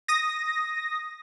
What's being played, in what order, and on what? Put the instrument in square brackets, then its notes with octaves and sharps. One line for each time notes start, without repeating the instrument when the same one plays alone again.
[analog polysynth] D#6 A#6